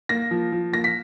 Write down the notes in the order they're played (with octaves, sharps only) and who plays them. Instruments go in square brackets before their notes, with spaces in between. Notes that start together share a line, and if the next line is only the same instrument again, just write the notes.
[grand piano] A#3 A#6
F3
F3
A#3 A#6
B6